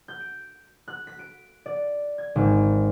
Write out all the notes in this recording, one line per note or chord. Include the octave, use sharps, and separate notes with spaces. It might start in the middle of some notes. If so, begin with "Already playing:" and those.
G6
D7
F#6
B6
D7
D5
G#6
G#1